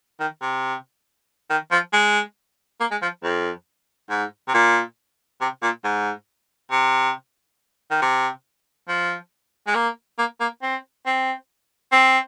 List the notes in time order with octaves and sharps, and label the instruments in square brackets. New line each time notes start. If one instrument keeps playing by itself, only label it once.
[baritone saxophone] D#3
C3
D#3
F3
G#3
A#3
G#3
F3
F2
G#2
C3
A#2
C3
A#2
G#2
C3
D#3
C3
F3
G#3
A#3
A#3
A#3
C4
C4
C4